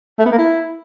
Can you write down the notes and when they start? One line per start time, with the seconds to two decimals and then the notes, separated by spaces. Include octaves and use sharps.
0.19 A3
0.25 B3
0.32 A#3
0.38 E4